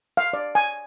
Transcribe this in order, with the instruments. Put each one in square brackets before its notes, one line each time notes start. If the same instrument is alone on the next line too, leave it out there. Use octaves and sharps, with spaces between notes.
[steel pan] F5
D5
G#5